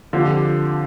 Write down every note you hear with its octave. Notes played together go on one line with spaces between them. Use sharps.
D3 F3 C4 G4